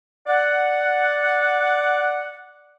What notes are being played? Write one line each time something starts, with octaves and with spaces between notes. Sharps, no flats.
D5 F#5